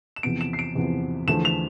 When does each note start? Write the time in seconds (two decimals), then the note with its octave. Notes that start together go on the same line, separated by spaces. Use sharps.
0.16 E7
0.23 E2 C3 F3 B3 D7
0.41 E7
0.53 C7
0.59 D7
0.75 E2 C3 F3 B3
1.27 E2 D3 F3 A3 E7
1.45 F7